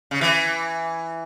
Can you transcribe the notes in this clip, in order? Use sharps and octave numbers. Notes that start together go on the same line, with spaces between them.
C#3
E3